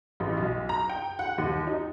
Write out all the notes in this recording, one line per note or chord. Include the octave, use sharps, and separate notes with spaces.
A1
B1
A#5
G5
F#5
D#2
D#4